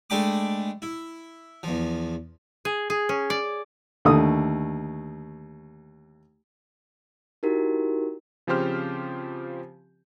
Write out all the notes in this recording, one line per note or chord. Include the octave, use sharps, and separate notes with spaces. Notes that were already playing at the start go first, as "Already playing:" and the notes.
G#3 A3 D4 G5 B5 D6
E4
E2 F3
G#4
G#4
C#4
D5
D#2 D3 A3 D#6
D#4 E4 F#4 G4 A#4
C#3 F3 C4 G4 C5 F6